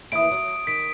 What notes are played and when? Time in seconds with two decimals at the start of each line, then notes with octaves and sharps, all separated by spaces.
0.12 D#2 E3 E4 D#6 D7
0.31 F#3
0.67 D#3 B6 D7